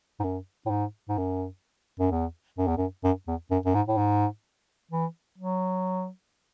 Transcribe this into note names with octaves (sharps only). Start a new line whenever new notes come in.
G#2
F#2
A2
G#2
G#2
F#2
F#2
E2
F#2
E2
F#2
F#2
E2
F#2
F#2
G#2
A2
G#2
E3
F#3